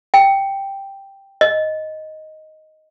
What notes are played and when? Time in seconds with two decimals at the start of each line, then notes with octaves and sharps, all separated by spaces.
0.14 G5
1.41 D#5